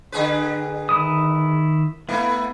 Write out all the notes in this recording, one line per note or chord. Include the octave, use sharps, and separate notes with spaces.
D3 G#4 B4
D#3 E4 D#6
A3 B3 E4